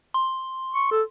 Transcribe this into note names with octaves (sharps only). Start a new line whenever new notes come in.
C6
C#6
A4